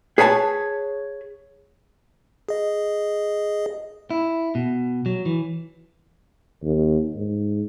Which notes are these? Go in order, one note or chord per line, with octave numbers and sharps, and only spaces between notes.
G#4 B4 C#5 G#5 A5
G#4 D#5
E4
B2
F#3
E3
D#2
G#2